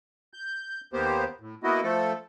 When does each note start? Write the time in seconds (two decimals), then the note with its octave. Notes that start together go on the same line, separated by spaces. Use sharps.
0.34 G6
0.93 D#2 A#3 B3 G4 C5
1.40 A2
1.63 A#3 B3 E4 F#4 D#5
1.83 F3 A3 A4